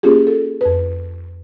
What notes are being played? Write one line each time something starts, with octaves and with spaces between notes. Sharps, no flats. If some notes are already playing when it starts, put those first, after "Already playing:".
A#3 C#4 F4 G4 G#4
A4
F2 B4